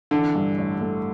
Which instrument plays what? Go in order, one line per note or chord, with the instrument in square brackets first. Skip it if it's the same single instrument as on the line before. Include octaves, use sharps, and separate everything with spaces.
[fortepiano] D3 [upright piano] E3
[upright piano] G2
A1
A3